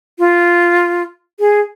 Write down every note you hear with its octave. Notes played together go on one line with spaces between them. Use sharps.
F4
G#4